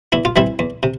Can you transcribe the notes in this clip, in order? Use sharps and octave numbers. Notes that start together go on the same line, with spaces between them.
E2 E4
F4
E3 G3 C4 E4
E2
C3